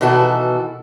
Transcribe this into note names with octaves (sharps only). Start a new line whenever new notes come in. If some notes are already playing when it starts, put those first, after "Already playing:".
B2 D#3 E3 F#4 A4